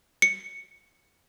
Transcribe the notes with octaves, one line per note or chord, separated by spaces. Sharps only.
C#7